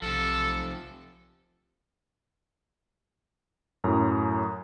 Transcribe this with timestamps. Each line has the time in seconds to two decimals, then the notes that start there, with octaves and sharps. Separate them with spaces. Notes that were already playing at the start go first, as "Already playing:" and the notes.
0.02 B1 C3 F3 A4
3.84 F#2 A2 A#5